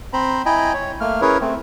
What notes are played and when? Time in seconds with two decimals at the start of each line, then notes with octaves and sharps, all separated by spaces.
0.13 C4 C5 A#5 B5
0.46 E4 D#5 G5 G#5 A#5 B5
0.74 C#5
1.00 A3 A#3 F6
1.21 C#4 E4 G#4 A#4 B4 C#5
1.41 A3 C4